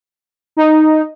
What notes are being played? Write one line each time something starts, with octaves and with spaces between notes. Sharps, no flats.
D#4